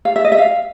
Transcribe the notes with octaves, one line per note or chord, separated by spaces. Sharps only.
F5
E5
D#5
E5
F5